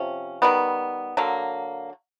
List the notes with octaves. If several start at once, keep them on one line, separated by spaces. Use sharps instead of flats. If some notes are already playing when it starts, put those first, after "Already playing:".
Already playing: C3 F3 C#4
D#3 G3 B3
D3 F#3 A#3